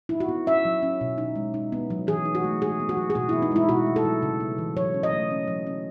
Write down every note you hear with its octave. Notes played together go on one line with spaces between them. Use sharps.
D#4 E4
F#4
B3
C#4 E5
F#3
C#4
B2
D#4
G#3
D#4
B3
F#3
E3 G#4
D#4
F#4
A3
D#4 G#4
B3
F#4
F#3
G#4
B2 F#4
E4
B3
D#4
G#3 E4
B2 F#4
A3
A4
F#3
C#3
B3
E3
F#3 C#5
C#4
D#5
A3
C#4
F#3
C#4